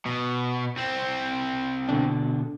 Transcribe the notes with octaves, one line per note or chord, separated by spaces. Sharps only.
B2
C2 C4
B2 D3 D4